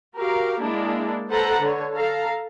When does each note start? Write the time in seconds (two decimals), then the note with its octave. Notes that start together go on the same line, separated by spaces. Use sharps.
0.15 F#4 G4 A#4 F5
0.60 G#3 A#3 D4 E4
1.29 A4 B4 C5 F#5 A5 A#5
1.59 D3 C#5
1.93 A4 F5 A#5